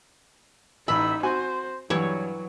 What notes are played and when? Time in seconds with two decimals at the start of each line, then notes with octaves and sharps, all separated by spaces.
0.88 A1 D#4 E5 B5 E6
1.23 C4 F#4 C5 G#5
1.90 G2 E3 F#3 E4 G4 C#5 D6